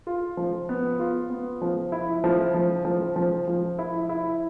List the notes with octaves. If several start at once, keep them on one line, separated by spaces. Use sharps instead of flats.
F4
F3
B3
F4
B3
F3
E4
F3
F3
F3
F3
F3
E4
E4